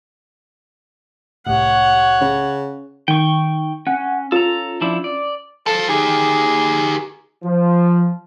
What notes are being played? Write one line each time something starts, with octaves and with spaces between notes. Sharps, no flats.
C2 A2 C#5 F#5
C#3
D#3 G5 C#6
C#4 F#5
C#4 F4 A4 A#5
F3 D4 E4
D5
A4 F5 A5
D#4 G4 G#4
F3